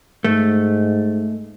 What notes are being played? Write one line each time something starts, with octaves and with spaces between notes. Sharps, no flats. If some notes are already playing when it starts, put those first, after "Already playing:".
G#2 A3